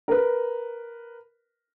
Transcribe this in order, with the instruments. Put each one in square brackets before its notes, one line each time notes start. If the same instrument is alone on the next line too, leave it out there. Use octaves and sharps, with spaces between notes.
[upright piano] A#4 B4